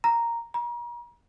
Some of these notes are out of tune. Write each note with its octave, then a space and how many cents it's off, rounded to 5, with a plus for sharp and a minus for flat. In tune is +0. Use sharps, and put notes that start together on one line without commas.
A#5 +0
A#5 +40